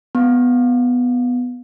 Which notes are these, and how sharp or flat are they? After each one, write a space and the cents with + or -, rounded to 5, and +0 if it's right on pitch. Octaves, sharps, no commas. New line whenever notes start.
B3 +5